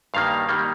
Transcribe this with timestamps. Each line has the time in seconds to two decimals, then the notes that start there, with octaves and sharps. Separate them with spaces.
0.14 G2 D#3 G3 A#3 F5
0.49 D#3 G3 A#3